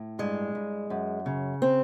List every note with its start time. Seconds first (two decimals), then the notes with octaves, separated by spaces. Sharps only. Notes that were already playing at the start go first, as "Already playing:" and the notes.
Already playing: A2
0.19 G2 G#3
0.55 G2
0.90 F#2
1.26 C#3
1.62 C4